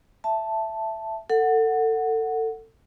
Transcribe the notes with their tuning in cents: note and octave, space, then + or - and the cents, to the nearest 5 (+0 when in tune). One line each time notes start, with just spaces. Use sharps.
E5 +10 A5 +0
A4 +30 F#5 +0